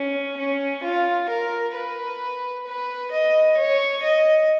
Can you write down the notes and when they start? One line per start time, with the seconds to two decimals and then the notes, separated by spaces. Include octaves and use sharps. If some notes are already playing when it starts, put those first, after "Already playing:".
Already playing: C#4
0.37 C#4
0.83 F4
1.29 A#4
1.75 B4
2.66 B4
3.11 D#5
3.57 C#5
4.03 D#5